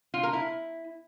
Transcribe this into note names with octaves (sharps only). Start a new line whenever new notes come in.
F4
A#4
E4